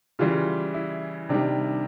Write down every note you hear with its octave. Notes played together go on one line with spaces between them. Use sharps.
C#3 E3 G3 F4
E4
C3 D#3 G3 D4